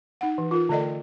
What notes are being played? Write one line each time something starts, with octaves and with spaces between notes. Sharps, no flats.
D#4 F#5
E3
F4 A#4
D3 A3 A4 D5 D#5 G5